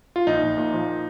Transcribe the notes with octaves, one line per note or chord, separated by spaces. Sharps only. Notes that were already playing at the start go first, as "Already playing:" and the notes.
F4
A#1 D#4
A#1
A#2
F3